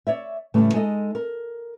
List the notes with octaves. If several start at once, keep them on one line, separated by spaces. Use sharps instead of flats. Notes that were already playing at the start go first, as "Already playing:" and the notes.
C#5 D5 E5
A2 C#3 E3 G3 A3
G#3 D#4 A4 D#5
A#4